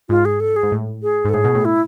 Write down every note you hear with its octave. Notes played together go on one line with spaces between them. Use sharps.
G#2 F4
G#4
A4
G#4
G#2
A2
G#4
G#2
A4
A2 G#4
B2
A2
E4